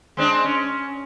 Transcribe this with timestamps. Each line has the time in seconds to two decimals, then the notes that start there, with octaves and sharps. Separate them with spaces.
0.17 G#3 C4 D4
0.44 C#4